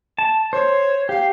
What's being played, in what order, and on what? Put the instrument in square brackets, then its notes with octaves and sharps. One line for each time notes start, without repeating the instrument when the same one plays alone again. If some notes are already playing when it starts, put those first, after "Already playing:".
[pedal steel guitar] A5
[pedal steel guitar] C5 [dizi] C#5
[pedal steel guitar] G4 [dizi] F5